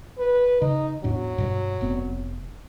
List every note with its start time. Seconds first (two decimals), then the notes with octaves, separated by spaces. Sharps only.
0.18 B4
0.62 C#3 D#4
1.04 E2 A2 F#3 D4
1.38 G2 B2
1.81 F1 B3 C4